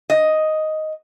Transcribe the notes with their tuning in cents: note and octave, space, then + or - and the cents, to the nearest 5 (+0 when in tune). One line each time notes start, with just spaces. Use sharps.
D#5 +5